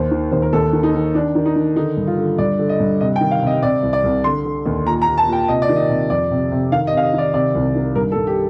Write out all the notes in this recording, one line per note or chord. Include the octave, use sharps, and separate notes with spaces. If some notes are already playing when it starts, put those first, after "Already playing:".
Already playing: D#2 C5
D#3
D#2 C5
A#4
D#2 A4
D#3
D#4
D#3
D#3 D4
D#3
D#4
D#3
D3 D#4
G2
F4
D3
G2 D5
D3
D#5
G2
C3 D#5
G5
D#3
F5
C3 D#5
C3 D5
C2
D5
C2
D3 C6
D3
D#2
A#2 A#5
A#5
A#2
A5
A#2 G5
C3 D#5
D5
D#3
D#5
C3
F2 D5
C3
C3
D#3 F5
D#5
C3 F5
D#5
D#3 D5
C3 D5
C2
D#3
G2 A#4
A4
G2
G4